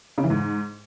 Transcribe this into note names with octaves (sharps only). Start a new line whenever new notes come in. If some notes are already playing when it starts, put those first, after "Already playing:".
C#3
E3
G#2